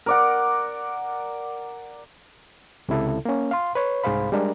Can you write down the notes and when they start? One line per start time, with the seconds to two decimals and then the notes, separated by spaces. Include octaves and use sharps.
0.06 A#4 D5 F#5
2.89 C#2 C3 E4 A4
3.25 A#3 C#4
3.51 F5 C6
3.75 B4 C#5
4.04 C2 G#2 G#4 C5 F5 B5
4.32 G3 G#3 D4 A#4